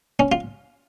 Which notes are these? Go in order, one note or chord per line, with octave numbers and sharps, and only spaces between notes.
C#4
F4